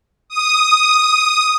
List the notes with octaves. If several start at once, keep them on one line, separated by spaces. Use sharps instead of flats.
D#6